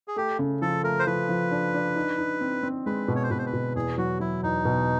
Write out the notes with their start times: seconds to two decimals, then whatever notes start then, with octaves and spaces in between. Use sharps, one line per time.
0.08 G#4
0.16 A3 G4
0.39 C#3
0.62 F3 A4
0.83 A3 A#4
0.99 C5
1.06 F3 B4
1.29 F3
1.51 D4
1.74 D4
1.96 D#4
2.18 D#4
2.41 C4
2.63 C4
2.86 G#3 B4
3.08 B2
3.16 C#5
3.23 C5
3.30 B2 B4
3.38 C5
3.46 B4
3.53 B2
3.75 E2 G#4
3.98 F#3 F#4
4.20 F#3 E4
4.43 E2 D#4
4.65 B2